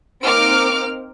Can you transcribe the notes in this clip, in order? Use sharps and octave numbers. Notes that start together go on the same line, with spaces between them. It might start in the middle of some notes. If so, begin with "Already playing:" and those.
A#3 C4 D#4 D6 F6 D7